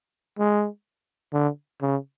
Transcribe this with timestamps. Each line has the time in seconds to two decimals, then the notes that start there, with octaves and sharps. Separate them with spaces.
0.39 G#3
1.33 D3
1.82 C#3